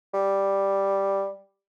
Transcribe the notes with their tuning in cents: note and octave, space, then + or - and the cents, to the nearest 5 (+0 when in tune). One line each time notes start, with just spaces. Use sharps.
G3 +0